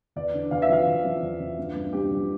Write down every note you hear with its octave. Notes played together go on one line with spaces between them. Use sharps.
E2 D5
D3
E2 F5
E5
F3 F5
E2
F3
E2
F3
G2
G2
G2 G4
F3